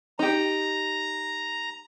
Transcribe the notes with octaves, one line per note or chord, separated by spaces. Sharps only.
D#4 G4 A#5